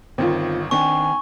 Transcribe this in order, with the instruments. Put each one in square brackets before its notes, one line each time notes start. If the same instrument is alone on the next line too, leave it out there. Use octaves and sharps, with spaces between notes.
[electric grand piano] G1 D#3 [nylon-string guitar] C4 F4
[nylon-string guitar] D#3 C4 [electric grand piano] D4 [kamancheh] G#5 [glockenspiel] C#6